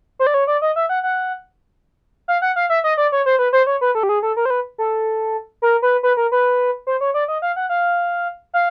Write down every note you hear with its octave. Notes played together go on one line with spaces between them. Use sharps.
C5
D5
C#5
D5
D#5
E5
F#5
F#5
F5
F#5
F5
E5
D#5
D5
C#5
C5
B4
C5
C#5
B4
A4
G4
G#4
A4
A#4
C5
B4
A4
A#4
B4
B4
A#4
B4
C5
C#5
D5
D#5
F5
F#5
F5
F5